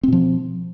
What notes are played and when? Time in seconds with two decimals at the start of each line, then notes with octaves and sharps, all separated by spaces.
0.03 C4
0.08 B2
0.13 F3